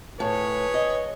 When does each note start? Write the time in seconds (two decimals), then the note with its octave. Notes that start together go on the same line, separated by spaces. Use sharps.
0.20 A2 G#4 B4 C#5
0.74 D#5